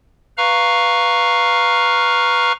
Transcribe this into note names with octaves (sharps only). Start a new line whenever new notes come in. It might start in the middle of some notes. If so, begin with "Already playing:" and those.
B4 F5 A#5 C#6 F6